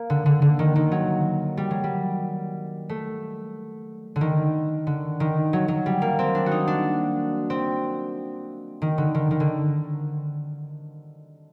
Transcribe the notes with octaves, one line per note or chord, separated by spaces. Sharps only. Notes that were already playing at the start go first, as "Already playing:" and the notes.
Already playing: A#3
D3
D3
D3
D#3
D#3
F#3
G3
F#3
G3
A3
D3
D#3
D3
D#3
F#3
F#3
G3
A#3
C4
D4
F#4
D#4
D4
C4
D#3
D3
D#3
D#3
D3